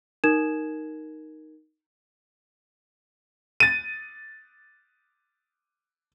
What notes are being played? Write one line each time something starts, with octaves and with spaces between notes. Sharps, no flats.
D#4 A#4 G#6 E7
A6 D#7